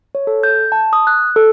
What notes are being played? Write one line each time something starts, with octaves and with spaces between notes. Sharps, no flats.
C#5
A4
G6
A5
D#6
F#6
A4